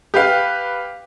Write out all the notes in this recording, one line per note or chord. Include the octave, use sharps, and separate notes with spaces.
G4 B4 F5